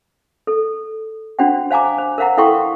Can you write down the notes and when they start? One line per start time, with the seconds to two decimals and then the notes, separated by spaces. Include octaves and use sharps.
0.47 A4
1.39 D4 F#4 C5 F#5 G5
1.71 C5 F5 G#5 A#5 D6
1.98 C5
2.18 A#4 C5 F5 F#5 A#5
2.37 E4 A4 F5 G5 C6 C#6